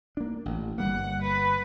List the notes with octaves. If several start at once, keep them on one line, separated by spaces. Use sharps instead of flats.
A#3 D4
A1
G1 G3 A#3 F#5
B4